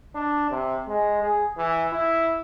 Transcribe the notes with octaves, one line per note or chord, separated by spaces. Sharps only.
D4
C3
G#3
G#4
E3
E4